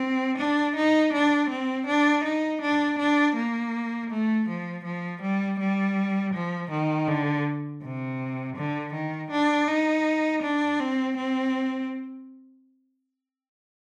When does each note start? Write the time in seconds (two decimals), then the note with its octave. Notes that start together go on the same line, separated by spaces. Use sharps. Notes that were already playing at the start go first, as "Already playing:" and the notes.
Already playing: C4
0.39 D4
0.76 D#4
1.13 D4
1.50 C4
1.87 D4
2.25 D#4
2.62 D4
2.99 D4
3.37 A#3
4.11 A3
4.49 F3
4.85 F3
5.22 G3
5.60 G3
6.34 F3
6.72 D#3
7.08 D3
7.83 C3
8.56 D3
8.94 D#3
9.32 D4
9.68 D#4
10.43 D4
10.80 C4
11.17 C4